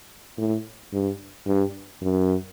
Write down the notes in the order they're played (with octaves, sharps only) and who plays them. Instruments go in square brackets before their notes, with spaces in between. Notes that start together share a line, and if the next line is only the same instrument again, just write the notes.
[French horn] A2
G2
G2
F#2